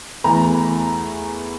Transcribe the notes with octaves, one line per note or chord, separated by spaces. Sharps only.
E2 E3 A3 A#5